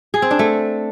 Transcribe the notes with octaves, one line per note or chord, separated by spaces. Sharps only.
G#4
C4
D4
A3